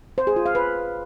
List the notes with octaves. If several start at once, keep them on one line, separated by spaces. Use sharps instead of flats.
C5
G#4
F4
F5
B4